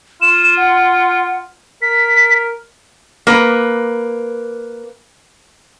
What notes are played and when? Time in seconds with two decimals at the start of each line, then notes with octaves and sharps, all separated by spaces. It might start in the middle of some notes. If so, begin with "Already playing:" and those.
0.22 F4 E7
0.57 F#5
1.82 A#4 B6
3.27 A#3 B4